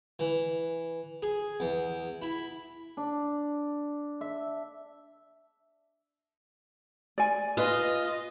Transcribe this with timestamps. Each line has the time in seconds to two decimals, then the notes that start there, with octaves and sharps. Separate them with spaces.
0.19 E3
1.22 G#4
1.60 E2
2.22 E4
2.97 D4
4.21 E5
7.18 D5 G#5
7.57 F4 B4 D#5